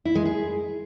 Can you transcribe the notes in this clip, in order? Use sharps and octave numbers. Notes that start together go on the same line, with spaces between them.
E4
G#3
G#4